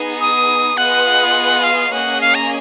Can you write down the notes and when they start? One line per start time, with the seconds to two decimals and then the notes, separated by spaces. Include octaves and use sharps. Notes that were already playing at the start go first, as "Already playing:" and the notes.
Already playing: B3 D#4 G#4
0.20 D#6
0.77 B3 F4 G#4 B4 D#5 F#5
1.64 F5
1.92 A#3 C#4 G#4 D#5 F#5
2.21 F5
2.35 A#5